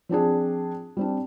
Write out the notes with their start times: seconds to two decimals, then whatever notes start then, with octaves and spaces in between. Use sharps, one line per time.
0.09 F3 C4 D4 G#4
0.97 G3 C4 D4